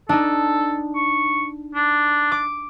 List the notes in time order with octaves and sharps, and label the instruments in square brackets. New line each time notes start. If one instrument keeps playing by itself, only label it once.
[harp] D4 D#4 [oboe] A4
[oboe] C#6
D4
[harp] D6